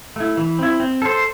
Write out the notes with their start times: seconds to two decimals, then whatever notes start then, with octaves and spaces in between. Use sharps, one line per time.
0.16 A3 E4
0.37 E3
0.59 C4 E4
0.80 C4
1.02 A4 C5